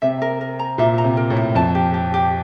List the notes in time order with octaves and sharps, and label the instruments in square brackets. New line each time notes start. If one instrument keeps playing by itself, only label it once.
[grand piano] C3 [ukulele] E5
[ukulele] A#4
A#4
A#5
[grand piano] A#2 [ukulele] E5
[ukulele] A#5
[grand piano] C3
[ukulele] A#4
[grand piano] A2
[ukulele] E5
[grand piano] F2 [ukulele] A5
[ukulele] G4
G4
G4